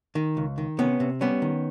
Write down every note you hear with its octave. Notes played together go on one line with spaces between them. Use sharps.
D#3
C#2
D#3
C3 B3 C#4
C3
G3 B3 C#4
D#3